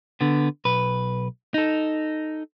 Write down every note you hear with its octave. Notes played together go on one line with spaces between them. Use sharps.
D3 B3
B1 B4
D#4 A4